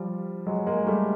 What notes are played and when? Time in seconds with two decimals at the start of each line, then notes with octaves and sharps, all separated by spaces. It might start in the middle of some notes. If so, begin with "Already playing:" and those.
Already playing: F3 G3
0.47 F#3 G#3
0.67 G#3 A#3
0.87 G3 A3